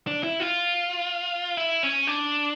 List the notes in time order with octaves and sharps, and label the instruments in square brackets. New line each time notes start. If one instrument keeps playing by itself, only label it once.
[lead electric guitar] D4
E4
F4
E4
C#4
D4